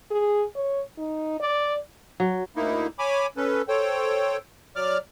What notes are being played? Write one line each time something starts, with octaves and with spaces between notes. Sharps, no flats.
G#4
C#5
D#4
D5
F#3
D2 A#3 D#4 E4
C#5 G#5 B5 D6
C#4 A4 B4
A4 C5 C#5 G5
F#3 D5 D6 F6